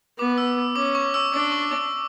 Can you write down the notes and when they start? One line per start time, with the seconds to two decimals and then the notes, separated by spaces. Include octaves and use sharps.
0.19 B3 D6
0.38 E6
0.76 C#4 D6
0.95 C#6
1.14 E6
1.33 D4 D6
1.52 C#6
1.71 D6